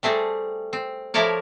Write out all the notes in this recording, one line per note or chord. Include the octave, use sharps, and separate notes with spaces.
G3 A3 C4 G#4
C4
F3 A3 E4 A#4 C#5 D5